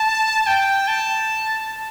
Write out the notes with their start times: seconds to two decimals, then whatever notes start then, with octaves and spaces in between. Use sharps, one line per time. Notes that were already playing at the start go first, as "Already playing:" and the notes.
Already playing: A5
0.46 G5
0.88 A5